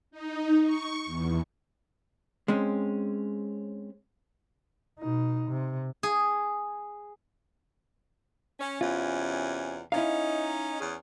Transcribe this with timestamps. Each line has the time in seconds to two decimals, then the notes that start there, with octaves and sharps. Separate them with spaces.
0.11 D#4
0.64 C#6
1.06 E2
2.48 G#3 C4 C#4
4.99 B2 D#4
5.49 C3
6.03 G#4
8.59 C#4
8.81 E2 C3 C#4 F4
9.92 C#4 D#4 E4 F5
10.79 E2 C#4 G#4